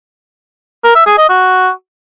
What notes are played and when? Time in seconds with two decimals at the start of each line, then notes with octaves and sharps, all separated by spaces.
0.84 A#4
0.95 E5
1.06 G#4
1.18 D#5
1.29 F#4